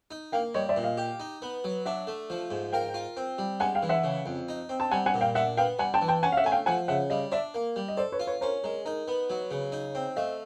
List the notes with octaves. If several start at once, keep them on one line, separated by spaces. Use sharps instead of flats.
D#4
A#3 F5 G5
G3 C#5 D#5
D5 E5
A#2
D#5 F5
G4
D#4
B3
F#3
D4 E5 F#5
A3
F3
G#2
A#4 F5 G5
F4
C4
G3
G#3 F#5 G#5
F5 G5
E3
E5 F#5
C#3
F2
D#4
C4
A5
G3 F#5 G#5
F#5 G#5
A#2
F5 G5
D4 E5 F#5
B3 F5 G5
G3 F#5 G#5
G5 A5
E3
G5 A5
C#4 F#5 G#5
F5
E5 F#5
A3 G#5
F5 G5
F3 F#5 G#5
C#3 E5 F#5
G3 D#5 F5
D4 D5 E5
A#3
G3
D#5
A4 C5 D5
B4 C#5
F4
B4 C#5
C#4 A#4 C5
G#3 A#4
D#4 A#4
B3
F#3
C#3
D#4
C4
A3 D#5 F5